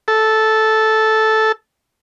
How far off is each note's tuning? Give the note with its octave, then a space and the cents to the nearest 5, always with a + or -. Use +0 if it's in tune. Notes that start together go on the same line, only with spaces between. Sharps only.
A4 -5